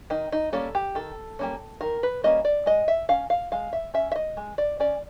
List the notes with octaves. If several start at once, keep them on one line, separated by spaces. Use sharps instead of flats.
D#3 D#4
D#4
G3 A#3 C#4 A4
G4
D#3 A4
G3 A#3 C#4
D#3 A#4
B4
G3 A#3 C#4 D#5
D5
G#3 D#5
E5
C#4 F5
F5
G#3 F5
E5
C#4 E5
E5
D#5
G#3
D5
C#4 D5